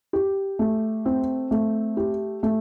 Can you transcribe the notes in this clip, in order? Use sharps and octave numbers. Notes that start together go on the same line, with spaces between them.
G4
A3
C4
A3
G4
A3